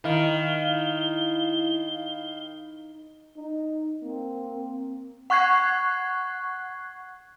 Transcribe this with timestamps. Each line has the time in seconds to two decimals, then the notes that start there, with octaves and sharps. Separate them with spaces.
0.04 D#3 E4 F5 G7
3.36 D#4
4.03 A#3 C4
5.30 F#5 C#6 F#6 G#6 C7